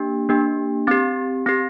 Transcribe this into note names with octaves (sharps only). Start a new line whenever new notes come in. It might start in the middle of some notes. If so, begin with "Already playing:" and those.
Already playing: A#3 D4 G4
A#3 D4 G4
C4 G4 A6
C4 G4 A#6